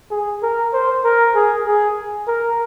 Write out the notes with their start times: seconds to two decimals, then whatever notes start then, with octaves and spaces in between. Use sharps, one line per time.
0.11 G#4
0.43 A#4
0.74 C5
1.04 A#4
1.35 G#4
1.67 G#4
2.28 A#4